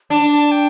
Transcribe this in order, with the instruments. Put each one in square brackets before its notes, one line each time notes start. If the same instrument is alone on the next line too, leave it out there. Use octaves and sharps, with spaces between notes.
[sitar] D4 [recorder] A5
[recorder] A5
G5